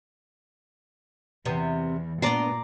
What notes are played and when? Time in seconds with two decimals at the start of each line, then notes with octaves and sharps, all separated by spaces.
1.45 E2 C3 B3
2.22 A#2 B3 D4 D5 A#5 C6